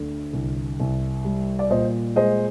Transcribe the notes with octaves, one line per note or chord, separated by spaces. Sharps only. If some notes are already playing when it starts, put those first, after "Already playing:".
Already playing: D2 D3
C2
C2
G3
D5
A#2 C5 D#5
G#3 C5 D#5